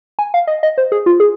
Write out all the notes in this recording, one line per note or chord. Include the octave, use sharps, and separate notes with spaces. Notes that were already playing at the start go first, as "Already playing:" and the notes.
G#5
F5
D#5
D#5
C5
G#4
F4
G#4